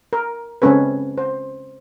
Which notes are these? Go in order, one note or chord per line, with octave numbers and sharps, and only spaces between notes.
A#4
C#3 G#3 C4 C#4 A4 B4
C5